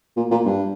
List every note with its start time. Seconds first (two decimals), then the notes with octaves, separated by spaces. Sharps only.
0.17 A#2
0.31 A#2
0.45 G2